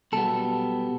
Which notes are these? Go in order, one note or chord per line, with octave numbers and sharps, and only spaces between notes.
B1 B2 G3 B3 A4